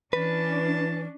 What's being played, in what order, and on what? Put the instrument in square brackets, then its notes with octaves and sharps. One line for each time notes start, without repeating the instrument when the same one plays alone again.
[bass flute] E3 [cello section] C#4 D4 [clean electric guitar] B4 [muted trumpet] A5